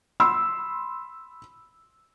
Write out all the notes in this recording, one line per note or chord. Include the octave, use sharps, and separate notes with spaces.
B5 C6 E6